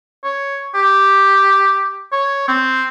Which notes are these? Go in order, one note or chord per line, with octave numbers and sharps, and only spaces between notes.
C#5
G4
C#5
C4